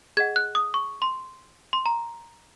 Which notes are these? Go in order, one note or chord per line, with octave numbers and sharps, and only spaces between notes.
G#4 D#5 F#5 G#6
F#6
D#6
C#6
C6
C6
A#5